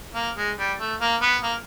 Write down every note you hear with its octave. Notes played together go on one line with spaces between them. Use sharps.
A#3
G#3
G3
A3
A#3
B3
A#3